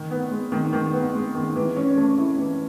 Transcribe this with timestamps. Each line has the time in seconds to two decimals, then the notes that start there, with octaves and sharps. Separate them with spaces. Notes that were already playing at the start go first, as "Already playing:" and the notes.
Already playing: D#3
0.11 B3
0.31 G#3
0.52 D#3
0.73 D#3
0.93 B3
1.15 G#3
1.35 D#3
1.56 E3
1.76 C#4
1.97 A3
2.18 E4
2.38 E3